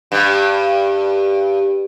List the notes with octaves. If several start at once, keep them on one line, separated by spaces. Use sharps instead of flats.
G2